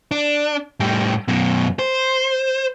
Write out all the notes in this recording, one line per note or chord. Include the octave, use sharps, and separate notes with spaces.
D4
A2 G3
F#2 B2
C5